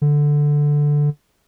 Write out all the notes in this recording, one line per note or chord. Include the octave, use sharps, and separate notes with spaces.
D3